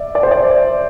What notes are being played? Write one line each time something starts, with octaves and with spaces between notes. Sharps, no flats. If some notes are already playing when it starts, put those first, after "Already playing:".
Already playing: D5 E5
D5
C5
D5